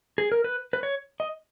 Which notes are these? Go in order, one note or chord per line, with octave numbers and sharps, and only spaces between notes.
G#4
A#4
B4
B4
C#5
D#5